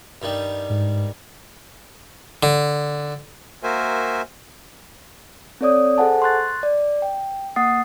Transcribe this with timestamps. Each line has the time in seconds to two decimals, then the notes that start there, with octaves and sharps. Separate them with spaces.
0.22 G2 D#3 G3
0.70 G#2
2.43 D3
3.63 A#3 F#4 A#4 C5 E5 G#5
5.61 C4 A4 C#5 D5 D#6
5.98 G#4 A4 C5 F#5 G#5 A5
6.22 C6 C#6 F#6 A6
6.63 D5
7.02 G5
7.56 A#3 F#5 D#6 A6 C7